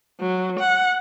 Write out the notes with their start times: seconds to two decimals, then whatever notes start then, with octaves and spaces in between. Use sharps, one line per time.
0.20 F#3
0.60 F#5